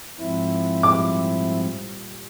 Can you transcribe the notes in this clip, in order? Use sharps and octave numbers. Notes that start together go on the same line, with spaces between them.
G#2 F3 C4 E4
A#2 G3 D6